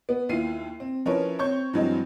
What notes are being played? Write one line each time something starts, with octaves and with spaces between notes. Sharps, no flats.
B3
D#2 E4 F4 C7 D#7
C4
F3 C#4 E4 A#4 B4 C#5
C4 C#5 C#6 G6
G2 E3 F#3 G#3 C4 D#5